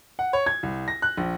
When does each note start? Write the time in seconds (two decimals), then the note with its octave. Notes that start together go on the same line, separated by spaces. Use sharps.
0.19 F#5
0.33 C#5
0.46 G#6
0.63 C2
0.88 A#6
1.02 F#6
1.17 A#1